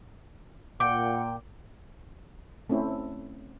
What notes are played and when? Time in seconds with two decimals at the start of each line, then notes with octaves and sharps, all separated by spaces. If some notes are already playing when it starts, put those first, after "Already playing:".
0.80 A#2 F#5 G5 D6
2.70 A3 C4 C#4 E4